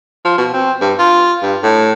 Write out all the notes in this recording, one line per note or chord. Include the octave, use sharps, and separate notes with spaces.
F3
B2
C4
G2
F4
G2
A2